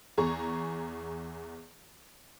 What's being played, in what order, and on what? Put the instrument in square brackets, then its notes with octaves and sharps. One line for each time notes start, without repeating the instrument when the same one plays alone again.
[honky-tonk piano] E2 G#4 A#5 C#6